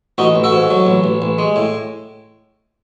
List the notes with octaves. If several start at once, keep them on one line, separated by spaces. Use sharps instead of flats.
A1 D#4 F#4
A1
F#4 A4
G#2
F#3
A1
A1
A1
G#3
A2